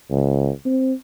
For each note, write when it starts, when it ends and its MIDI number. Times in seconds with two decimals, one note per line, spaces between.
0.10 0.50 37
0.65 0.93 60